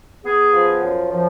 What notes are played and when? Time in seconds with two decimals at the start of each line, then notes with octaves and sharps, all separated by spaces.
0.24 B3 G#4
0.53 F3
0.82 F#2
1.12 F3